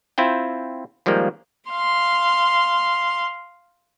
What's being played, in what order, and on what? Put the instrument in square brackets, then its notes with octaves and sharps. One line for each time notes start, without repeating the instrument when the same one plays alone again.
[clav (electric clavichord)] C4 E4 F4 G5
D#3 F3 G3 G#3 A#3
[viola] F5 C6